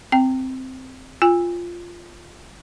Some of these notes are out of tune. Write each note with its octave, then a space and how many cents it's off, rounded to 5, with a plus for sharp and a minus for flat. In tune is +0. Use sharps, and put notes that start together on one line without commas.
C4 -5 G5 +0
F4 -5 G#5 -35